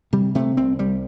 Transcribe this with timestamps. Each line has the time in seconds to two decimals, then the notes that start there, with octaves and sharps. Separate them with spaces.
0.13 C3 G3
0.35 C3 A3
0.57 C2 C4
0.79 C2 G3